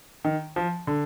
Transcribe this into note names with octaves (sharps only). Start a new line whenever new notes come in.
D#3
F3
D3